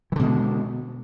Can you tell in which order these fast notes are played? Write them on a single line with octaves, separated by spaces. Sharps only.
E3 D3 B2 G#3